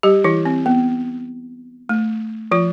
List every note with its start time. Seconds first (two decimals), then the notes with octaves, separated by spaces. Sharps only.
0.03 G3 G4
0.24 E3 E4
0.45 C4
0.66 B3
1.89 A3
2.51 F3 F4